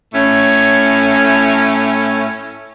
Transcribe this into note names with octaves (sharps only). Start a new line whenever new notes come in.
A2 A3 C#4